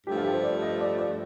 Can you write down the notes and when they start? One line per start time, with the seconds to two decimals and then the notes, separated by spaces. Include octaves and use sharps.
0.07 G2 F3 A3 G4
0.16 F4
0.25 G4
0.34 C5
0.44 D5
0.62 D#5
0.81 D5
0.98 D5